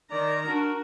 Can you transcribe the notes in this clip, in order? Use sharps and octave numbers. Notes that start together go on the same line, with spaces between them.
D#3 D5 A#5
D4 F#4 A#4